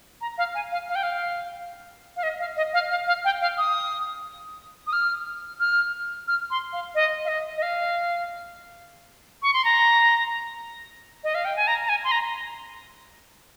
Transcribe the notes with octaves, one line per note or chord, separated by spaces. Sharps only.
A#5
F5
G#5
F5
F5
G5
F5
F5
D#5
F5
D#5
F5
F5
F5
G5
F5
D#6
D#6
F6
F6
F6
C6
F5
D#5
F5
D#5
D#5
F5
C#6
C6
A#5
D#5
F5
G5
G#5
A#5
A#5
G#5
C6
A#5